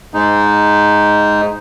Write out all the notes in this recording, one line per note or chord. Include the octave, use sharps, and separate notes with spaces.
G#2 G#3 D#4